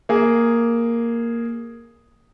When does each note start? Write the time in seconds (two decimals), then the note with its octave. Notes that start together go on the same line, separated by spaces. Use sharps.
0.09 A#3 G#4